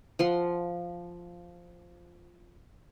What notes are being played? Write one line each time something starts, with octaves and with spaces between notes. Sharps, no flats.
F3 F#5 C6